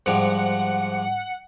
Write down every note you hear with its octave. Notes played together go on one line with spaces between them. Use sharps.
G#2 F3 G3 F#5